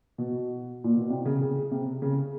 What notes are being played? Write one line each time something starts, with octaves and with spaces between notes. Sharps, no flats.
B2
A#2
B2
C3
C#3
C#3
C3
C#3